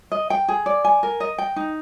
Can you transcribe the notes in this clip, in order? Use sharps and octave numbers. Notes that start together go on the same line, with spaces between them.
D#5
G5
G#4
D5
G#5
A#4
D#5
G5
D#4